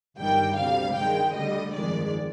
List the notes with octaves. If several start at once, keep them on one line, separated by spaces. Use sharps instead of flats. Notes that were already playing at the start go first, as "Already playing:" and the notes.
G1 G2 D#3 G3 G5
D2 C3 G3 F5
G2 D#3 G#3 G5
D2 D3 G3 D#5
G1 F2 D#3 G#3 D5